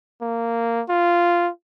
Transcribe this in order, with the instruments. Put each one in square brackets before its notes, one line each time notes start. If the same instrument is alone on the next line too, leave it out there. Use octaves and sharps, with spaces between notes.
[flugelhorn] A#3
F4